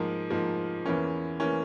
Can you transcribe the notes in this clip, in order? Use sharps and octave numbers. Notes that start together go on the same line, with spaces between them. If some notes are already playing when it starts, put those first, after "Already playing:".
Already playing: G#2 F3 A#3 A#4
G#2 F3 A#3
E2 E3 A#3 C#4
E3 A#3 C#4